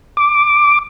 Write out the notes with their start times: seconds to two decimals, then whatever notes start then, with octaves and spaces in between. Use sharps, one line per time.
0.17 D6